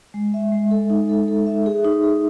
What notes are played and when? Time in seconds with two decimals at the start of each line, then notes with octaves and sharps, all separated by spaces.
0.14 G#3
0.34 E5
0.52 G#3
0.71 A4
0.90 D#4
1.09 A4
1.28 A4
1.47 E5
1.66 G#4
1.85 D#4
2.03 G#4